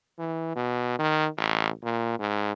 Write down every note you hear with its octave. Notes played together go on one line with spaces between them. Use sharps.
E3
B2
D#3
A1
A#2
G#2